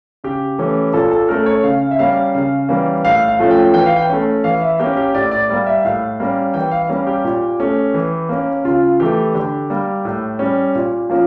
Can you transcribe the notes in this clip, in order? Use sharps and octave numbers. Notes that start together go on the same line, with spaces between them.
C#3 G4
E3 A3 C#4
A#2 A4
A4
A3 C#4 A#4
C#5
C#3 F5
E5
G3 A#3 C#4 F5
C#3
E3 G3 A#3 C#4
A2 F5
F5
F3 A3 C#4
G5
E3 G5
F5
G5
A3 C#4
E3 F5
E5
A#3 C#4 G4
G4
A2 D5
D5
G3 A#3 D5
E5
A2 F5
G3 A#3 C#4
E3 G5
F5
G3 A#3 C#4
G4
A#2
A3 C#4
E3
A#3 C#4
C#3 F4
E3 A3 G4
D3 G4
G3 A#3
A2
G3 C#4
A#2
F3 A#3 C#4